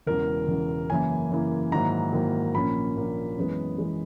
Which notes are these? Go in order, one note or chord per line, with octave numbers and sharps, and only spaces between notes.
E1 E2 C#3 E3 A#4
E1 E2 C#3 E3
F#2 C#3 E3 A#3 E4 G#5
F#2 C#3 E3 A#3 E4
G#2 D#3 F#3 A#3 E4 A#5
G#2 D#3 F#3 A#3 E4
A#1 A#2 A#3 C#4 B5
A#1 A#2 A#3 C#4
F#2 E3 G#3 B3
F#2 E3 G#3 B3